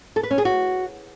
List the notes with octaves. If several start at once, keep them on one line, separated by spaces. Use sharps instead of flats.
A4
B4
C#4
G#4
F#4